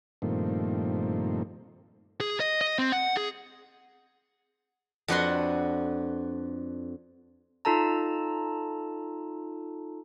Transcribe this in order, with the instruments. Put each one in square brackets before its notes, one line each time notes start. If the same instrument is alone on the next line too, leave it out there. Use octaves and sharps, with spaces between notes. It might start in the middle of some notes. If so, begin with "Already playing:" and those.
[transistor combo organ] G2 A#2 D#3 F3 A3 C4
[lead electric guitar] G#4
D#5
D#5
C4
F#5
G#4
[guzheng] F2 D4 F#4 B4 F#5 C6
[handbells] D#4 F4 A4 A5 A#5